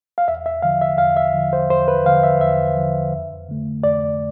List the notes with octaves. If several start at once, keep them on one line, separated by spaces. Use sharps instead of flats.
F5
E2 E5
E5
D3 F3 F5
E5
E2 F5
E5
D3 F3
C5
E2 C5
B4
D3 F3 F5
E5
E2 E5
D3 F3
F2
D3 A3
F2 D5